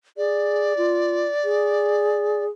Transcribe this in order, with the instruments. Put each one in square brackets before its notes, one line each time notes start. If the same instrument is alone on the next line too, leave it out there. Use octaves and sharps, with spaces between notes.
[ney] G#4 [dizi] D5
[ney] F4
G#4